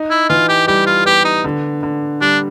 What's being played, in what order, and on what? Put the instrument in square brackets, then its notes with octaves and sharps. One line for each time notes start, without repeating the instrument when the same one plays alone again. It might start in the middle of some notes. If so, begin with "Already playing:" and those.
Already playing: [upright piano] D#4
[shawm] E4
[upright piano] E3 [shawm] F4
[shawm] G4
[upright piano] G3 [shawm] G4
[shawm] F4
[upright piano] B3 [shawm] G4
[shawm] D#4
[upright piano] D3
D3
[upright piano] G3 [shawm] D4